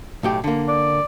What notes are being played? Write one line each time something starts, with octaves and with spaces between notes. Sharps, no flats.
B1 A2 G4
D3 A#3
D5